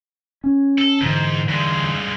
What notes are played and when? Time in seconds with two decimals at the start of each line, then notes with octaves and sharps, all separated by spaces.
0.44 C#4
0.78 A4
1.02 G#2 D3 E3
1.49 G2 G#3